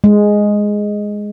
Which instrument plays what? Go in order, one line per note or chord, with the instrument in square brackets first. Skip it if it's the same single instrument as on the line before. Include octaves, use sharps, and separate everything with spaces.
[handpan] G#3